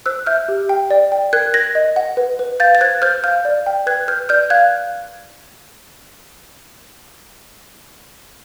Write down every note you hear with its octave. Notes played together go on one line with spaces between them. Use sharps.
C5 E6 F#6
E5 F6 G6
G4
G5
D5
G5
A#4 F#6 G#6
A#4 G#6 A#6
D#5
F#5
B4
B4
F5 G6 A6
A6
C5 F#6 G#6
C5 F6 G6
F5 F6 G6
D5
G5
B4 F#6 G#6
B4 F6 G6
D5 F6 G6
F5 F#6 G#6